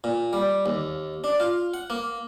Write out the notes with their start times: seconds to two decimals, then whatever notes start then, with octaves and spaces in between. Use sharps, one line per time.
0.04 A#2
0.33 G3
0.66 D#2
1.24 D4
1.40 F4
1.74 F#5
1.90 A#3